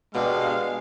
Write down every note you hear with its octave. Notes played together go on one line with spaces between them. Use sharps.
B2 G#3 B3 D4 G4 F5